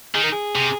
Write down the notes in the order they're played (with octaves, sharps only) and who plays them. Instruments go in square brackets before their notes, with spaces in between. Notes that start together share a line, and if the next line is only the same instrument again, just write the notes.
[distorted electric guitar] D#3 [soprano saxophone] G#4
[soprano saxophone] A#4
G#4
[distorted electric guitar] C3